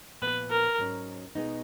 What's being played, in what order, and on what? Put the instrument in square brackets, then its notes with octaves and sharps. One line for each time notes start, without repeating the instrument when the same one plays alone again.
[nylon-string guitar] A#2 F3 B3 [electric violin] B4
[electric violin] A#4
[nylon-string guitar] G#2 F#3 C#4
B2 G#3 B3 D#4